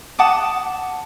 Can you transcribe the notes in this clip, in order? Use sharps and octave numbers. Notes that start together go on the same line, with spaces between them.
F#5 A5 D6 D#6